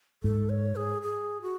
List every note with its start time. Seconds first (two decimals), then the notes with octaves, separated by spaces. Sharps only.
0.23 G#2 A4
0.49 C#5
0.76 G#4
1.02 G#4
1.42 F#4